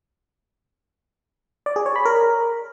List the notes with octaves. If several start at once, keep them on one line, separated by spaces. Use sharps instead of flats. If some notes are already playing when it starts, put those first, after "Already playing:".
D5
G#4
C#5
B5
A#4